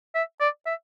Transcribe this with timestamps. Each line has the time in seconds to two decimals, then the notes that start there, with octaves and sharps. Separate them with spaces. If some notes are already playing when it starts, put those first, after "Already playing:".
0.15 E5
0.40 D5
0.66 E5